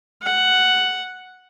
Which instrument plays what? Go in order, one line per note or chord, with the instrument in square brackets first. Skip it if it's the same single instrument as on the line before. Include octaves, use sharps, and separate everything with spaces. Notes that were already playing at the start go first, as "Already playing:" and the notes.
[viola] F#5